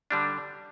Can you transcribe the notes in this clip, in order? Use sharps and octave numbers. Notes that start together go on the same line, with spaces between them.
D3 G3 D4